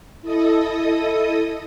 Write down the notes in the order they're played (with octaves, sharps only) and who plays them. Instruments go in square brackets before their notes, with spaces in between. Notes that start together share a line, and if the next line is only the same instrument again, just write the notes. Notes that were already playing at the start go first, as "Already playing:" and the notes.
[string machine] E4 A4 D#5 D#6